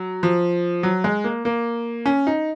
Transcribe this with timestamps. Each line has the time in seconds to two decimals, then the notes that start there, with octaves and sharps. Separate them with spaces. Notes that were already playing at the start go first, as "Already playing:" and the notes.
Already playing: F#3
0.23 F3
0.83 F#3
1.04 G#3
1.24 A#3
1.45 A#3
2.06 C#4
2.27 D#4